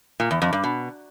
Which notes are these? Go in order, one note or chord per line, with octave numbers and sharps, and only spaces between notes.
A#2
E2
F2
G2
B2